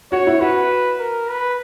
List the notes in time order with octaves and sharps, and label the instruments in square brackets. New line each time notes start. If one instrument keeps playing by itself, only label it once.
[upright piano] F#4 [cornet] C#5
[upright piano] E4
[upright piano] F#4 [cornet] B4
[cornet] A#4
B4